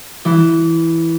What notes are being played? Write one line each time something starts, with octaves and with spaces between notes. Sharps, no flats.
E3